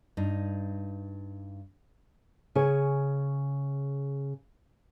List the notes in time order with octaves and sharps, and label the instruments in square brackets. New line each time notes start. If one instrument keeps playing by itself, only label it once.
[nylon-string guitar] G2 D#4
C#3 G#4 C#5